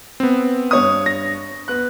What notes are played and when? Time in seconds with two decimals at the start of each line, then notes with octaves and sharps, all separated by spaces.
0.20 B3 C4
0.71 G2 C#5 D#6
1.06 A#6
1.68 B3 F#6